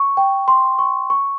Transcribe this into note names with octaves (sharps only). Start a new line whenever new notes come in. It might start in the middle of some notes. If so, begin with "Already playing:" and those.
Already playing: C#6
G5
C6
C#6
C#6